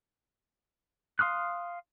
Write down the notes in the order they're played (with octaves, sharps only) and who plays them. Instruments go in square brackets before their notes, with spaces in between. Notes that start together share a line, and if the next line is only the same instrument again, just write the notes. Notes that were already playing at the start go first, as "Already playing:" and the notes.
[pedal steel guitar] F5 C6 D#6 F6 F#6